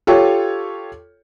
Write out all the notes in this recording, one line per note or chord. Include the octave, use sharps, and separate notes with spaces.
F4 G4 A4 C#5